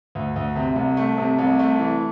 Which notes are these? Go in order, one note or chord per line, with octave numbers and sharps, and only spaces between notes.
D2
D2
C3
C2
A3
C3
C2
A3
E3